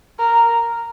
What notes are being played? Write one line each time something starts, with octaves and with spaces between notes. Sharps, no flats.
A#4